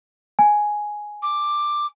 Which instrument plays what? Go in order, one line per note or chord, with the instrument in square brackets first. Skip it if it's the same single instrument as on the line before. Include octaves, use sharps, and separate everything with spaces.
[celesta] G#5
[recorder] D6